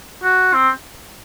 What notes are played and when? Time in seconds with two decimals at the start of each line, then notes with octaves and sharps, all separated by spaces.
0.23 F#4
0.53 C4